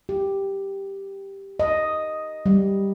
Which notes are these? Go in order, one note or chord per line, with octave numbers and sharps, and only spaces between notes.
G4
D#5
G3